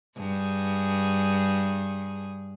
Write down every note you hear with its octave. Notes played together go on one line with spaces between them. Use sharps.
G2 G#4